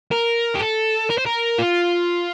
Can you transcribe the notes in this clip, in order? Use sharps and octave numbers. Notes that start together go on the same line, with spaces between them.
A#4
G4
A4
A#4
C5
A#4
F4